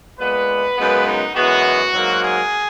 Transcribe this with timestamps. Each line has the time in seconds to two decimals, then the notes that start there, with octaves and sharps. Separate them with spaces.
0.18 A#2 G#3 B3 B4
0.76 F#2 C#3 G#3 B3
1.06 D#4
1.35 F#2 E3 G#3 B3 F#4
1.94 G#2 F#3 A#3
2.23 G#4